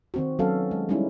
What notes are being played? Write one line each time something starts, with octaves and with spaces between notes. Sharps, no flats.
D#3 C4 F#4
F#3 B3 C#4 F#4 A4 F5
G#3
G3 G#3 B3 C#4 D#4 E4